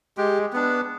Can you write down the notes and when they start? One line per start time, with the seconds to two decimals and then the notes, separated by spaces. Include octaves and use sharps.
0.17 G#3 G4
0.53 B3 D4